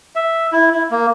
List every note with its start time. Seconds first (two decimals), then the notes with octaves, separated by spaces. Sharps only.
0.15 E5
0.52 E4
0.72 E4
0.91 A#3